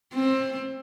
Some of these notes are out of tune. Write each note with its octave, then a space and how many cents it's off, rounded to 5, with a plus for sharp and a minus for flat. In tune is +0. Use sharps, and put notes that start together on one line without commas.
C4 +20